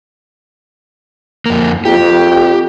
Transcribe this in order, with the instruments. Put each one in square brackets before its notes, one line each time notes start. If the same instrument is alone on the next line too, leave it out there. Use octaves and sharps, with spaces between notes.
[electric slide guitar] F2 A#3
[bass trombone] F2 [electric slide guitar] G4